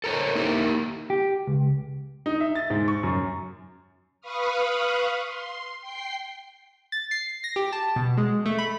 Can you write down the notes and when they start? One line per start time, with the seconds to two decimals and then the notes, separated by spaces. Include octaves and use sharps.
0.04 A4 A#4 C5 C#5
0.35 A#3 D#4 E4 G4 A#4
1.10 G4
1.47 C#2
2.26 D#4
2.40 E5
2.55 A6
2.70 G#2
2.88 C#6
3.03 F#2
4.21 B4 F5 B5 C#6 D#6 F6
5.23 C6
5.81 G5 G6 C7
6.92 A6
7.11 C7
7.44 A#6
7.56 G4
7.73 A5
7.96 B2
8.17 G#3
8.46 A3
8.58 B5